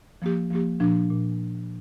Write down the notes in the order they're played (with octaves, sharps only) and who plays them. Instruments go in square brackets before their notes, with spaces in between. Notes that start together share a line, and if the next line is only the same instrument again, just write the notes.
[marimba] F3 A#3 G4
F3 A#3 G4
A#2 F3 D4
A#2